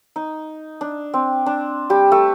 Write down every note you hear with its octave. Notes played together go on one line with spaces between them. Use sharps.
D#4
D4
C4
D4
G3 G4
A3 A4